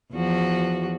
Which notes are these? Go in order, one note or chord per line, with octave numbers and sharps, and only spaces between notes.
E2 F3 F#4